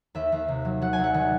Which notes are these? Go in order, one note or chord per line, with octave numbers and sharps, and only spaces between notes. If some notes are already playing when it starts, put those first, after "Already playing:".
D#2 E5
D#2
C3
F#3
F#3 F#5
G#5
C2
F#5
D#3